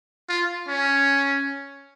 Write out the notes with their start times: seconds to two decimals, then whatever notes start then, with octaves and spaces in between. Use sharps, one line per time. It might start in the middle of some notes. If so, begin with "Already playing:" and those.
0.29 F4
0.68 C#4